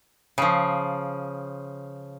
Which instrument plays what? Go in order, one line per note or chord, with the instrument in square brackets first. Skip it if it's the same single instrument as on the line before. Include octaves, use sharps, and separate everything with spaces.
[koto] C#3 F3